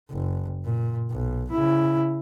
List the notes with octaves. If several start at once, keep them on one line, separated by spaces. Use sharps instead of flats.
F#1
A#2
B1
C#3 E4